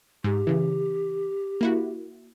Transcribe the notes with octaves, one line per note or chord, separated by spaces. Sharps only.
G#2 G4
C#3 E3
A#3 E4 F#4